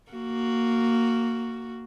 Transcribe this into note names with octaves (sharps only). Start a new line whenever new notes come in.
A#3 F#4